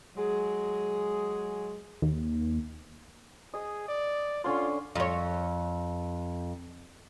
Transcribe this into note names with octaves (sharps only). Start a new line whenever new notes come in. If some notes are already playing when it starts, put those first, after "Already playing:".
F#3 G#3 G#4
D#2
G#4 D#5
D5
D3 C#4 F4 C6
F2 C#5